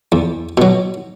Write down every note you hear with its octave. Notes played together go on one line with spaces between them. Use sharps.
E2
B2 F#3